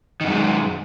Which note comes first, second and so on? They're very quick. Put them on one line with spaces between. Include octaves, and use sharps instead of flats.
D#3 F#2 G#3